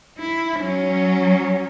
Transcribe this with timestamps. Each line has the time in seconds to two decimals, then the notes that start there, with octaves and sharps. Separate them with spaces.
0.18 E4
0.60 F#3 C#4